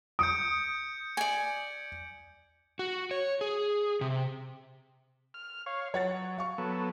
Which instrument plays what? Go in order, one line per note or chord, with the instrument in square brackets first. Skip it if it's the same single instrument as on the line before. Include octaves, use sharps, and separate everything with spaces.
[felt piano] D#6 [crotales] G6 C#7 D7
[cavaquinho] D5 G#5
[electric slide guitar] F#4
C#5
G#4
C3
[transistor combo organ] F6
C#5 F5
[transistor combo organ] F#3 [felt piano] C#5 F#5 A6
[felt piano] F5 C#6
[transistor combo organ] F#3 B3 A4